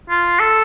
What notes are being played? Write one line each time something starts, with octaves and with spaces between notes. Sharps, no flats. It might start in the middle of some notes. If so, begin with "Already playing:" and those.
F4
A4